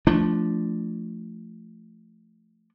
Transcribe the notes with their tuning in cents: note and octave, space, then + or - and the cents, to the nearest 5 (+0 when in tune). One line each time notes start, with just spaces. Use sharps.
F3 -10 A3 +0 D4 +0